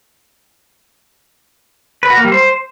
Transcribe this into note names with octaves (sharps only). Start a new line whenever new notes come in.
B4
F#4
A#3
G3
C5